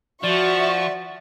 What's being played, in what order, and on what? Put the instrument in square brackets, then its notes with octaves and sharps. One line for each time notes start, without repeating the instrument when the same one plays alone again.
[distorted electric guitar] F3 [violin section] F#4 E5 C#6 [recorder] D5